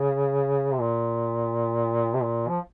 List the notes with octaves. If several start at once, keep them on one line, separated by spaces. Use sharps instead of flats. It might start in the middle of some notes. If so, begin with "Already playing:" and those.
Already playing: C#3
C3
A#2
C3
A#2
F3